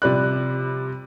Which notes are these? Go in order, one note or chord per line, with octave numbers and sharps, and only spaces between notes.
C3 F3 G3 D5 B5 F#6